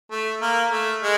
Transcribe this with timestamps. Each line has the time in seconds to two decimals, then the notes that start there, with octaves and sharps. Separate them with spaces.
0.11 A3
0.42 A#3
0.72 A3
1.02 G#3